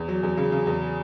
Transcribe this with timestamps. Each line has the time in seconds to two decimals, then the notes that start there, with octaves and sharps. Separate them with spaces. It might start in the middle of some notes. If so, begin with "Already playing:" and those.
Already playing: E2
0.08 F#3
0.23 E2
0.37 C#3
0.52 C#3
0.67 E2